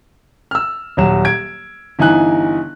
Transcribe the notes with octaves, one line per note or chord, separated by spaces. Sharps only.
E6 F6
D#1 F#3 E7
G#6 D7
G1 E3 D#4 G#5 F#6